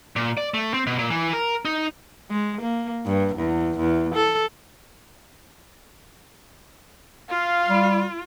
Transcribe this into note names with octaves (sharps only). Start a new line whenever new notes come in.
A#2
D5
A3
C4
B2
A#2
E3
A#4
D#4
G#3
A#3
G2
E2
E2
A4
F4 F5
G3